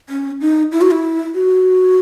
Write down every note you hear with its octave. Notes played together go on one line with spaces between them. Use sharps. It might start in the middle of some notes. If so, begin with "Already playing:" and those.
C#4
D#4
E4
F#4
E4
F#4